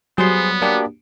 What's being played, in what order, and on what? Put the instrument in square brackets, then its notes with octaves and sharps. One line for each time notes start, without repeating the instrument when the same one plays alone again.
[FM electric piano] F#3 G3 [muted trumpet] B3 [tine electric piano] G#4 C5 C6
[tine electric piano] A#3 D4 G4